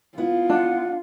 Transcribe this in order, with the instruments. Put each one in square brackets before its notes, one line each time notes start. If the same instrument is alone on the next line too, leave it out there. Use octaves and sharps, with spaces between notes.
[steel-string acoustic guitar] B3 E4 [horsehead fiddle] F4
[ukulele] D4 [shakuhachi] F#5